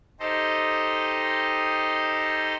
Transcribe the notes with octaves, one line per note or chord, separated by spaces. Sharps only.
D#4 G4 A4 C5 D#5